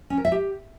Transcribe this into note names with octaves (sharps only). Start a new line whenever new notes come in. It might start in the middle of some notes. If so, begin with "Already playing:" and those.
C#4
A#4
E5
G4